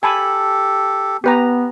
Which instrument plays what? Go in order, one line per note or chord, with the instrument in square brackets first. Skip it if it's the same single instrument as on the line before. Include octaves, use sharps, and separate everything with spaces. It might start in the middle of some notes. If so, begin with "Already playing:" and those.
[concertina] G4 A4 [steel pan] G#5 A5 B5
[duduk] B3 [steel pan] G4 B4 A#5